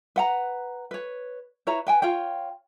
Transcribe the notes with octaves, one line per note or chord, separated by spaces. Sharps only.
B4 F#5 A#5
B4 C#5
E4 B4 C#5 A#5
B4 G5 G#5
F4 C#5 G5